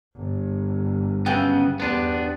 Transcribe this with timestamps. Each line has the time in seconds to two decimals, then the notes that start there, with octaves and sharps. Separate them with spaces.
0.15 G1
1.26 F#2 C#3 B3 G5
1.80 E2 B3 D4 G4 C5